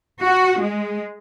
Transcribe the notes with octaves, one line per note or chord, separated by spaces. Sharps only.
F#4
G#3